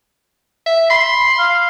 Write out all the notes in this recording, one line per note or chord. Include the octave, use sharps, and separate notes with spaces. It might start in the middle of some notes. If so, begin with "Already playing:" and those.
E5
B5 C6
F5